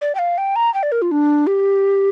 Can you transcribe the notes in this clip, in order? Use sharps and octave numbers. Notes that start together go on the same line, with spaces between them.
D5
G5
F5
G5
A#5
G5
D5
A#4
F4
D4
G4